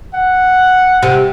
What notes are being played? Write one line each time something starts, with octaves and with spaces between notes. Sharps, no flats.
F#5
C3